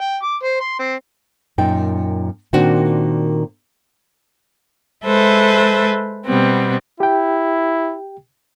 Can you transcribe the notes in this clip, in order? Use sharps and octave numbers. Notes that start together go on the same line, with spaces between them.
G5
D6
C5
C6
C4
F#2 A#2 D#4 G5
A#2 D#3 A#3 C4 D4 F#4
G#3 A4 B4 C5 E5
B2 G3 B3 C4
E4 G4 G5